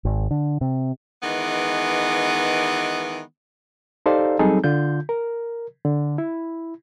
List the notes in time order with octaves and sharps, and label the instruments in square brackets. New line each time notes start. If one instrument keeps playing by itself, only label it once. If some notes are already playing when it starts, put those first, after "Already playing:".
[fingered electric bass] G#1
D3
C3
[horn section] D#3 E3 G#3 B3
[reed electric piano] D#4 G4 A4 C5 D5 F5
F#3 G3 C4 D#4 G#4 A4
D3 F4 G6
A#4
D3
E4